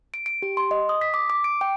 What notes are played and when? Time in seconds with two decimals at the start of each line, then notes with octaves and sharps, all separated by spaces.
0.14 D7
0.26 D7
0.42 G4
0.57 C6
0.71 D#5
0.89 D#6
1.01 B6
1.14 D6
1.30 D6
1.44 D7
1.61 G5